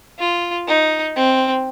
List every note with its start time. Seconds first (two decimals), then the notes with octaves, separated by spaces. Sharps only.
0.19 F4
0.68 D#4
1.16 C4